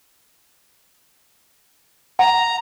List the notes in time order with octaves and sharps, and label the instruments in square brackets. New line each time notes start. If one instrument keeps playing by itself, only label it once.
[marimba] F#5 [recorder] A#5